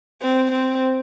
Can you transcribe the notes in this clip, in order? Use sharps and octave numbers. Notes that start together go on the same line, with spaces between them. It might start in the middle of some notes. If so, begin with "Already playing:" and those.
C4
C4